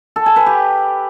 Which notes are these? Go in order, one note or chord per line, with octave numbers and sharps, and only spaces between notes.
A4
G#5
B4
G4